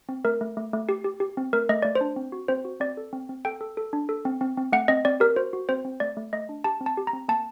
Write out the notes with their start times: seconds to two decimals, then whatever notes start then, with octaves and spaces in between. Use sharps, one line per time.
0.09 C4
0.25 A3 A#4
0.41 A3
0.57 A3
0.73 A3
0.89 G4
1.04 G4
1.20 G4
1.37 C4
1.53 A3 A#4
1.69 A3 D#5
1.82 A3 D5
1.95 C5
2.01 D4
2.16 C4
2.32 F#4
2.48 C4 C5
2.65 F#4
2.80 C4 D5
2.97 A4
3.13 C4
3.29 C4
3.45 A4 G5
3.61 A4
3.77 A4
3.93 D4
4.09 A4
4.25 C4
4.41 C4
4.57 C4
4.72 A3 F#5
4.88 C4 D#5
5.05 C4 D5
5.20 G4 A#4
5.36 F#4 C5
5.53 F#4
5.69 C4 C5
5.85 C4
6.00 A3 D5
6.17 A3
6.33 A3 D#5
6.49 D4
6.64 G4 A5
6.81 C4
6.86 A5
6.97 G4
7.07 A#5
7.13 C4
7.28 A#3 A5